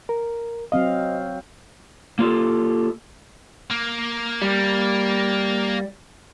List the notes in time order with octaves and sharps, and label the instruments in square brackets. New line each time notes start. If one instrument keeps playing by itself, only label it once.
[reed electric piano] A#4
[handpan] F#3 C4 F5 [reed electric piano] D#5
[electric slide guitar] A#3 F4 G4 A4
[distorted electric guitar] A#3
[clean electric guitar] G3